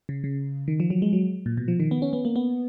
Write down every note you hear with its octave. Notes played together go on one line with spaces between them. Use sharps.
C#3
C#3
D#3
F3
F#3
G#3
F#3
A#2
B2
F3
D#3
B3
C#4
B3
A#3
B3